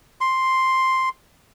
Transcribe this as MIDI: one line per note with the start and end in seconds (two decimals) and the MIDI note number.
0.21 1.09 84